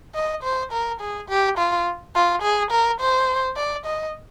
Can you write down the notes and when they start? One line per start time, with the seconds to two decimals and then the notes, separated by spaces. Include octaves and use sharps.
0.15 D#5
0.43 C5
0.72 A#4
1.00 G#4
1.29 G4
1.58 F4
2.15 F4
2.43 G#4
2.71 A#4
3.00 C5
3.56 D5
3.85 D#5